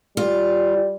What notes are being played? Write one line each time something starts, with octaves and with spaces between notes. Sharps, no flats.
G3 F4